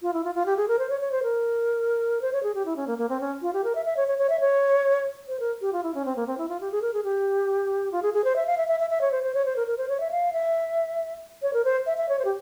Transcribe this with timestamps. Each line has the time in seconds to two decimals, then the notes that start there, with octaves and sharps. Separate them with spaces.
0.02 F4
0.13 E4
0.24 F4
0.35 F4
0.46 G4
0.57 G#4
0.68 A#4
0.79 C5
0.90 C#5
1.01 C#5
1.11 C5
1.23 A#4
2.21 C5
2.33 C#5
2.43 G#4
2.54 G4
2.65 E4
2.76 C#4
2.87 A#3
2.98 A#3
3.09 C4
3.20 C#4
3.42 F4
3.53 G4
3.64 A#4
3.75 E5
3.85 E5
3.97 C#5
4.08 C#5
4.18 C#5
4.29 E5
4.40 C#5
5.28 C5
5.40 A#4
5.61 G4
5.73 F4
5.83 E4
5.94 C#4
6.05 C4
6.16 A#3
6.27 C4
6.38 E4
6.49 F4
6.60 G4
6.71 G#4
6.82 A#4
6.93 G#4
7.04 G4
7.92 F4
8.02 G#4
8.14 G#4
8.24 C5
8.36 E5
8.46 F5
8.57 E5
8.68 E5
8.80 E5
8.90 E5
9.01 C#5
9.12 C5
9.23 C5
9.34 C#5
9.45 C5
9.56 A#4
9.67 A#4
9.77 C5
9.89 C#5
10.00 E5
10.11 F5
10.33 E5
11.42 C#5
11.53 A#4
11.64 C5
11.86 E5
11.97 E5
12.09 C#5
12.19 C5
12.25 G4